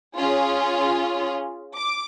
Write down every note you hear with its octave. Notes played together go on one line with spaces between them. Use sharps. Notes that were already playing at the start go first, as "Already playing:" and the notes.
C#4 F4 G#4
D6